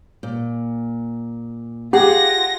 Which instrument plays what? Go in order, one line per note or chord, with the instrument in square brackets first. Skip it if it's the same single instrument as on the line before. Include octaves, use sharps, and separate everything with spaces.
[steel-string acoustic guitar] A#2
[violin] F4 A#6 [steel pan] G4 [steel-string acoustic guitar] G#4 F#5